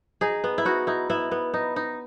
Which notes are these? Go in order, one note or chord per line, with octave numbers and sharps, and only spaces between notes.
D#4 G#4
B3
E4
D#4 F#4
D#4 E4
B3 E4
B3
D#4
D#4